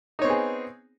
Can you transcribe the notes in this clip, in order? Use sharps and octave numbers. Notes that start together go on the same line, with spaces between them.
B3 C4 D#4 G#4 C#5